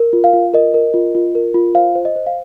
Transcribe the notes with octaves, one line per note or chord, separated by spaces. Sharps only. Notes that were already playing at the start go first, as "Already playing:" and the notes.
Already playing: A#4
F4
F5
F4
A#4 D#5
A#4
F4
F4
A#4
F4
C5 F5
C5
D#5
C5
F5